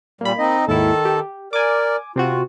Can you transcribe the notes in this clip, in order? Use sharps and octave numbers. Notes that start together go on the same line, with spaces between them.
A#2 G3 A#3 B5
C4 D#4 D#5
D#2 G#2 D#3 E4 A4 A5
G4
A#4 D5 G#5 D6
C3 C4 F4 F#4